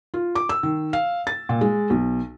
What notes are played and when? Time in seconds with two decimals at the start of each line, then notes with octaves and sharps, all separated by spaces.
0.14 F4
0.35 D6
0.49 E6
0.63 D#3
0.93 F5
1.27 A6
1.49 A#2
1.61 G#3
1.90 B1